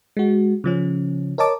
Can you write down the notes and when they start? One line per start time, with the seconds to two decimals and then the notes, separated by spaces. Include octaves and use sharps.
0.17 G#3 F#4
0.64 C#3 F3 C#4
1.38 A#4 C#5 D#5 A5 D6